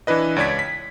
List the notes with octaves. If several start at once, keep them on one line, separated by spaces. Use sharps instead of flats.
E3 D4 E4 B4 D#5
C#2 C#5 D5 G#6 B6
B6